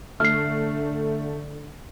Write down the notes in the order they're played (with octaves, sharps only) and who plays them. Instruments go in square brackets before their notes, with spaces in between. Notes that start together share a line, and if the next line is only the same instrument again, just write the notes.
[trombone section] D3 [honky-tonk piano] A3 [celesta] F6 C7